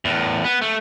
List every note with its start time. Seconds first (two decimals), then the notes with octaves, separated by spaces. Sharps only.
0.05 E2 A2
0.44 B3
0.62 A3